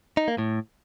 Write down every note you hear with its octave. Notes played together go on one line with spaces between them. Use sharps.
D#4
A#3
A2